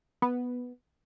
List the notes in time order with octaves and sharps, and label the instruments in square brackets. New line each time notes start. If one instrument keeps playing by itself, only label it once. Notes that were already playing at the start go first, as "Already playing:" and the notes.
[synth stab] B3